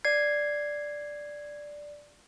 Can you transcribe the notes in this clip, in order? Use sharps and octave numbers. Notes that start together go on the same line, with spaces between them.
D5 G#6 C7